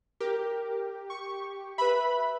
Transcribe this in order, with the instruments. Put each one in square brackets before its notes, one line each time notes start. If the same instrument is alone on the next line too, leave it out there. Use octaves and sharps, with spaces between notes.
[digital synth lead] G4 [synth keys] A#4
[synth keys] C#6
[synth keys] B4 B5 [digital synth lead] E5